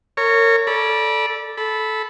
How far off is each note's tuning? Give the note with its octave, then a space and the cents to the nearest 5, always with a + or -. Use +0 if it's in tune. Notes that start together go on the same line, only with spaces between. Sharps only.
A#4 -30 C#5 +0
A4 +0 D5 +0 B5 -30
A4 -15 B5 +0